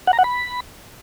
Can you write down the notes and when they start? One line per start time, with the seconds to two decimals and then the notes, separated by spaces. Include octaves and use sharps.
0.07 F#5
0.13 A#5
0.19 F#5
0.24 B5